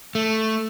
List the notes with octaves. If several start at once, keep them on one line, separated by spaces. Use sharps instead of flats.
A3